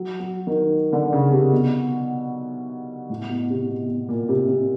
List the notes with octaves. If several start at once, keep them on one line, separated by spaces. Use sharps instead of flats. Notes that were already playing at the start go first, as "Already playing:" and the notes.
Already playing: F#3
F#3
D#3
D3
C#3
C3
B2
A2
B2
C3
B2
B2
A#2
C3
C3